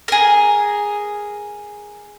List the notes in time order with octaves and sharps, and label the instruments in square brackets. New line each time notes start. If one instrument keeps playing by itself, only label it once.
[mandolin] G#4 A#4